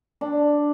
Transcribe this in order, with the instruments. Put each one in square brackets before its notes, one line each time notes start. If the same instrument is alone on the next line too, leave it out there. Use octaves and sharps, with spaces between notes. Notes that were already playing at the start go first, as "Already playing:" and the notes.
[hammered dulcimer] D4